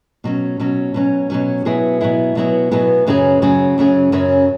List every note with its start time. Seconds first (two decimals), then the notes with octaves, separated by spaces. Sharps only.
0.24 B2 F#3 C#4
0.60 B2 F#3 C#4
0.94 B2 F#3 C#4
1.30 B2 F#3 C#4
1.65 B2 F#3 B3 E4 G#4
2.01 B2 F#3 B3 E4 G#4
2.35 B2 F#3 B3 E4 G#4
2.71 B2 F#3 B3 E4 G#4
3.07 F#2 C#3 F#3 C#4 G#4
3.42 F#2 C#3 F#3 C#4 G#4
3.78 F#2 C#3 F#3 C#4 G#4
4.12 F#2 C#3 F#3 C#4 G#4